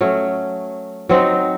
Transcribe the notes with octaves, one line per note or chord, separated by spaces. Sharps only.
F#3 A3 C#4
F#3 C4 D#4